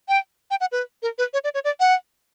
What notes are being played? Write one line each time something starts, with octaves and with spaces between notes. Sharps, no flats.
G5
G5
F#5
B4
A#4
B4
C#5
D5
C#5
D5
F#5